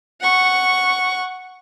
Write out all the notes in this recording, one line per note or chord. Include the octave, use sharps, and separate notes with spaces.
F#5 C#6